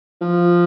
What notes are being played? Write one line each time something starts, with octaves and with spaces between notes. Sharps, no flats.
F3